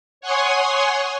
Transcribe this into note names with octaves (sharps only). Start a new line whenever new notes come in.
C#5 F#5 G#5 C6 C#6 D#6